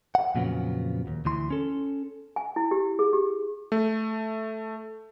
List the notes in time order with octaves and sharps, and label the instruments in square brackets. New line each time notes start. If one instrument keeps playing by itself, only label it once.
[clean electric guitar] F#5
F2 A#2 C#3 F#3 B3
D#2
D2 E3 C6
C#4 A4
[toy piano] G#5
E4
G4
G#4
G4
[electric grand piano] A3